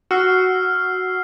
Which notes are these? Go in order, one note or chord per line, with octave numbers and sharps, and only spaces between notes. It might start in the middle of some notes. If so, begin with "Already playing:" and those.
F#4 E6 F6 C7